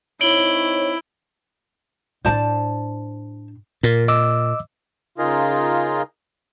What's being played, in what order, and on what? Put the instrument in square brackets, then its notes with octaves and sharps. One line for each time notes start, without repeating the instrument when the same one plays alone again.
[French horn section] C4 D#4 C#5 [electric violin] E4 [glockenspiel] D7 F#7 G7
[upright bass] A2 D4 [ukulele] C5 D5 A5
[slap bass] A#2 [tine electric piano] A#4
[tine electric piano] D#5 D6 E6
[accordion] C#3 F4 [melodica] D#4 G#4 A#4